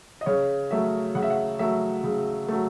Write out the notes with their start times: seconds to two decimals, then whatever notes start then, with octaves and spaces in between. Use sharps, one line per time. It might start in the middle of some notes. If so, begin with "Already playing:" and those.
0.21 D#5
0.26 C#3 C#5
0.71 F#3 A3 E5
1.15 C#3 F#5
1.22 E5
1.30 F#5
1.59 F#3 A3 E5
2.04 C#3
2.48 F#3 A3